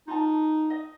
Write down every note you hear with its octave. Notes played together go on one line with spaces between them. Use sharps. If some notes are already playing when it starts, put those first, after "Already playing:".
D#4 F4 A5
D#5